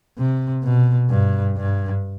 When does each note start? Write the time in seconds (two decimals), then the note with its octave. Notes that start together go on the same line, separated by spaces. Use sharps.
0.18 C3
0.64 B2
1.10 G2
1.57 G2